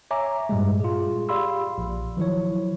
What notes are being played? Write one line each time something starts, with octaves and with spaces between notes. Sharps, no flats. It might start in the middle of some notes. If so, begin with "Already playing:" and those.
C#5 E5 G#5 A#5 D6
G2 A#2 G3 G#3
F4 G#4
G4 D5 F5 B5 C6 E6
A#1
D#3 F3 F#3 E4 C#5